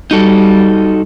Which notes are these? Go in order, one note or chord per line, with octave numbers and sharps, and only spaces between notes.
G3 D#4 F#4 A4